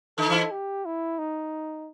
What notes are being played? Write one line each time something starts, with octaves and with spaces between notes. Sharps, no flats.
D#3 D#4 A4
E3 E4
G4
E4
D#4